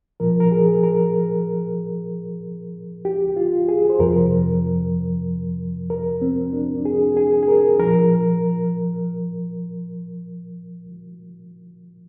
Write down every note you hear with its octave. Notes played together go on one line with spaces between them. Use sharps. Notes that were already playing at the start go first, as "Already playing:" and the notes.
A#2 F3 A#4
A#4
G#4
A#4
G4
F4
G#4
C5
F2 C3 F3 A#4
A#4
C4
D4
G#4
G#4
G#4
A#4
A#2 F3 A#4